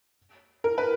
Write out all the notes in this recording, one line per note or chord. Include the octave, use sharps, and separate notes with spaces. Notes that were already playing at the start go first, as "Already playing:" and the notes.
A#4
B4